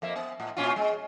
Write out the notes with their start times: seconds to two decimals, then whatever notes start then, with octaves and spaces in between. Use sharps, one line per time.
0.02 F2 A#3 E5
0.16 B3
0.40 A2
0.57 A#2 C#4 F4
0.76 G#3